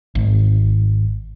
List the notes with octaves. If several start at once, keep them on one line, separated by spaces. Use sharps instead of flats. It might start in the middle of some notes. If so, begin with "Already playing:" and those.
G#1